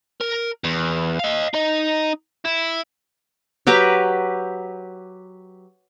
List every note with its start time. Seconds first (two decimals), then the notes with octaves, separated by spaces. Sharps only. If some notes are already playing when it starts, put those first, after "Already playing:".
0.21 A#4
0.64 E2
1.20 D#5 F5
1.54 D#4 D#5
2.45 E4
3.67 F#3 G4 B4 A#5